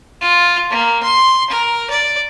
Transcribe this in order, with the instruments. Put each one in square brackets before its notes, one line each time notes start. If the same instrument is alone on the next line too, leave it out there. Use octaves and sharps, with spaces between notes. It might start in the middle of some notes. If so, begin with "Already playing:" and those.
[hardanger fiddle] F4
A#3
C6
A#4
D5